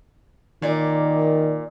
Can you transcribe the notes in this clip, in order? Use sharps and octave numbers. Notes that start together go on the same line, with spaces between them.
A#2 D#3 D5